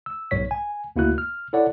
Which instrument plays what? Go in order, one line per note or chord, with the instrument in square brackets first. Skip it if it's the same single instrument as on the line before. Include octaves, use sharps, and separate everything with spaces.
[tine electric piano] E6
B1 G#2 C#5 B6
G#5
D2 A#3 E4 F#4 F#6
F6
E4 A4 C#5 D5 F#5